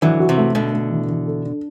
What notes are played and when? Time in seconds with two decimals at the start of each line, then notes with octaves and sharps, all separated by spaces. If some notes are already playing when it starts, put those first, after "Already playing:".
0.02 D3 E3 F#3
0.20 F#4
0.29 C3 E3
0.37 A3
0.55 B2 D3 A3
0.73 A3
0.91 E3
1.08 E3
1.26 A4
1.44 D4